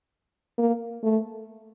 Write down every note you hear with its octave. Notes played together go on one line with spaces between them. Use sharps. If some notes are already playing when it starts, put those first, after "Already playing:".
A#3
A3